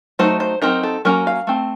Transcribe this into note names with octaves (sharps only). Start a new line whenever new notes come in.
F#3 A3 D#4 C5
C5
F#3 C4 D#4 A#4
A4
F#3 A#3 C#4 A#4
F5
A3 C4